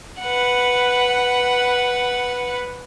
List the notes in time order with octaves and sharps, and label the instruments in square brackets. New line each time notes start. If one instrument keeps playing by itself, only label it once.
[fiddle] B4 F#5